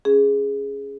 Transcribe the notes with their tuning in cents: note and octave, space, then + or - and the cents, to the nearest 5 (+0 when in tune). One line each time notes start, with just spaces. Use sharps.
C#4 +0 G#4 +0